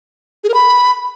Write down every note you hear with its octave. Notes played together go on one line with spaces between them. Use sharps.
G#4
A#4
B5